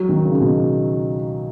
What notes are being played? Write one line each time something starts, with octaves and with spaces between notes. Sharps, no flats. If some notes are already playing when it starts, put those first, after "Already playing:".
Already playing: F#3
D#3
C#3
B2